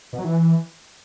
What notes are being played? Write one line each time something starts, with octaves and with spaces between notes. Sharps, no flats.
B2
F#3
E3